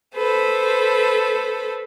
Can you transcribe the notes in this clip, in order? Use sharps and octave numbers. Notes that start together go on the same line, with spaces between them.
A4 B4 C5